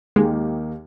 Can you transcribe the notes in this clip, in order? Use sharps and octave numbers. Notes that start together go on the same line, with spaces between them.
D#2 D#3 G#3 A#3 D#4 G4